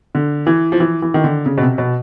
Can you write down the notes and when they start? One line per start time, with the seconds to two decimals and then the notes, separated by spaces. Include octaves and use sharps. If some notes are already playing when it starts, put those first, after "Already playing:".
0.15 D3
0.47 E3
0.72 F3
0.80 E3
1.02 E3
1.14 D#3
1.24 D3
1.46 C#3
1.58 B2
1.62 C3
1.78 B2